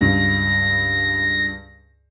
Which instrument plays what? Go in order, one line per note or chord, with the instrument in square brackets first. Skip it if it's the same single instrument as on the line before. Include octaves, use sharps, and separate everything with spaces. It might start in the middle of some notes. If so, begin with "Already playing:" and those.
[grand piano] C#2 G2 [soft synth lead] A#6